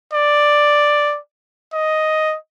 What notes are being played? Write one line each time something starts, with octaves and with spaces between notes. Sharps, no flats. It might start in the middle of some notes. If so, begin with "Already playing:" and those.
D5
D#5